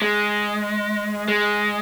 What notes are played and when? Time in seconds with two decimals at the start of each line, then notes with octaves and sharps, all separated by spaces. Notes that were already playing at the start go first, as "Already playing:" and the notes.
0.02 G#3
1.28 G#3